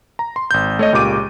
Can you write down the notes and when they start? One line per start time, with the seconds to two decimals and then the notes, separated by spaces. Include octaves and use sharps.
0.19 A#5
0.36 C6
0.51 G#1 G6
0.79 A3 C#5 D#5
0.93 C#2 A#2 G4 D6 D#7